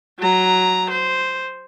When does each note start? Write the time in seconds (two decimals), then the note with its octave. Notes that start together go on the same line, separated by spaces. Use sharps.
0.20 F#3 A#5
0.90 C5